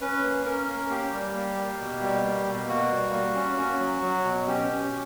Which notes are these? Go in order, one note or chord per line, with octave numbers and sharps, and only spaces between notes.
C#4 B4
A#3
C#4 A#4
A#3
A#3 G4
G3
A#3
A#3
B2
G3
A#3
B2
A#3 F#4
G3
A#3
C#4
C#4
F#3
F#3
B2
C#4 G4
C#4